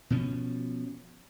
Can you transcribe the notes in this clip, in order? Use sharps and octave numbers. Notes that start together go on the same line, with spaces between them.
B2 F3 C#4